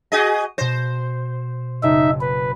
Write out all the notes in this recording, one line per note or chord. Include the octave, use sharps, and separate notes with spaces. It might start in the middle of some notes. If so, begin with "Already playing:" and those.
F#4 G#4 D#5
B2 C5 A#6
F#1 D#4 E5
B4